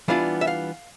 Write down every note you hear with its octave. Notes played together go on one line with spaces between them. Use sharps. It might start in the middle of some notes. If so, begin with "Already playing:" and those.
E3 G3 B3 D4 F4 F5
E5
F5